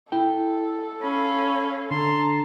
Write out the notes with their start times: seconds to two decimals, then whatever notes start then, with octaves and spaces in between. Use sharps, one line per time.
0.12 E4 A4 G5
1.02 C#4 F5 B5
1.91 D3 A5 A#5 C6